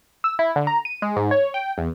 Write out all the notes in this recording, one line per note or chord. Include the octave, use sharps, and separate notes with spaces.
E6
E4
D3
A#5
D#7
G#3
G#2
C#5
G5
E2